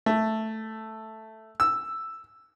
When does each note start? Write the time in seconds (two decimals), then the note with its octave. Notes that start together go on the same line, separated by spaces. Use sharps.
0.06 A3
1.60 E6